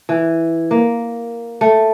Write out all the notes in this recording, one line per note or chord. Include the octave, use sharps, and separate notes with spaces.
E3
A#3
A3